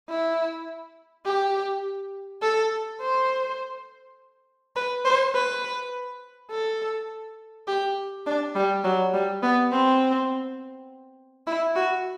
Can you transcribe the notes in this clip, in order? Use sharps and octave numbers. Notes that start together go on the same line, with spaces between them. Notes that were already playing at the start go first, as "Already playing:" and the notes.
E4
G4
A4
C5
B4
C5
B4
A4
G4
D4
G3
F#3
G3
B3
C4
E4
F#4